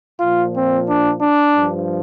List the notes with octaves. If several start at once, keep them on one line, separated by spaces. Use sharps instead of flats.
A#2 F3 F4
C4
D4
D4
G2 F3